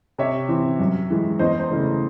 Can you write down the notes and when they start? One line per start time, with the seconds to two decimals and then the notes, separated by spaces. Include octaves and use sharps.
0.18 C3 C#5 E5
0.49 E3 C4
0.79 F#2
1.10 E3 G#3
1.39 E2 C5 D#5
1.60 C5
1.71 C#3 E3 A3